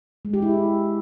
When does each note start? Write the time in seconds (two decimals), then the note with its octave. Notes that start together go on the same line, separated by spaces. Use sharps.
0.25 G#3
0.34 G4
0.42 E4